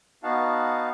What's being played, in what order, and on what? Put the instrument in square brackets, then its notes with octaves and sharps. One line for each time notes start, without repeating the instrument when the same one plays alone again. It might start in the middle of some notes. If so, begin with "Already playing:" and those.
[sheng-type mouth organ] B3 D#4 F#4 F5 F#5 A5